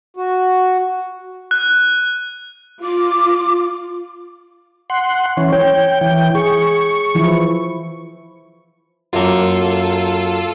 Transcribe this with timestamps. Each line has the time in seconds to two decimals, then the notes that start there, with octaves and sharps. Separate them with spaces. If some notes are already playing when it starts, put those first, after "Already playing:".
0.17 F#4
1.51 F#6
2.83 F4 D6
4.90 F#5 C6
5.37 E3 C#4
5.52 C#5 G5
6.01 E3 G5
6.35 G#4 C#6
7.15 E3 F3 E4
9.13 F#2 A#3 F4 A4